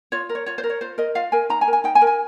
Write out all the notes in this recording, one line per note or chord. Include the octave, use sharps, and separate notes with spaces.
F4 C#5
A#4
C#5
F4 C#5
C5
A#4
C#5
F4 C5
A#4 D#5
F4 F5
A#4 G#5
D#4 A#5
G#5
A#4
G#5
D#4 G5
G#5
A#4
G#5